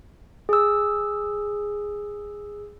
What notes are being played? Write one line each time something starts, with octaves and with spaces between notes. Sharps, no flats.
G#4 E6